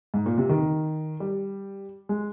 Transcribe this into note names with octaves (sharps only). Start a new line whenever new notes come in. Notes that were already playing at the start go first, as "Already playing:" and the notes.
G#2
A#2
C3
D#3
G3
G#3